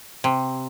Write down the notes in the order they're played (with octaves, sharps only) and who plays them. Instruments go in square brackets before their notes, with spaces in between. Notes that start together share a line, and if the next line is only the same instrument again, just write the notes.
[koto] C3